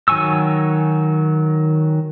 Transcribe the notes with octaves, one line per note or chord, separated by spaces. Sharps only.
D#3 F#3 G#5 C#6 E6